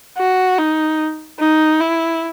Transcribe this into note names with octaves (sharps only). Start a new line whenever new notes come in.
F#4
D#4
D#4
E4